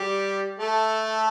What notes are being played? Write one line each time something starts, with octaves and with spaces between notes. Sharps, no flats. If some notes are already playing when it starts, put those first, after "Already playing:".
Already playing: G3 G4
A3 A4